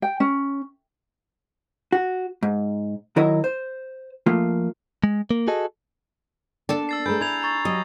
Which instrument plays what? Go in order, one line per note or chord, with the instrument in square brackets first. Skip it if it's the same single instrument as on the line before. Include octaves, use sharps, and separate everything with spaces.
[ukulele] G5
C#4
[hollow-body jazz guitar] F#4
G#2
D#3 F#3 E4 A#4 C#5 D#5
C5
F3 A3 A#3 F4
[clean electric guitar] G#3
A#3
F#4 G#4 A4 D#5
[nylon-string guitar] A#3 [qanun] D4 A4 A5
[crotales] E6 A6 C7
[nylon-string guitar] A3 G#4 B4 [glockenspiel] G#5 A#5 [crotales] G6
[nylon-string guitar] E4 [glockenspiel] B5 G#6 F7
[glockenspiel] A#5 C#6 A6
[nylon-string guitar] F#3 G4 [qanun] D#5